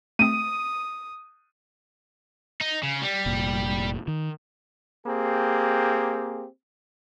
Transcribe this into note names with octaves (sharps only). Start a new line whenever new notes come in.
A3 C4 D#6 D#7
D#4
C#3
G3
F1 A#2
D#3
A#3 C4 G4 G#4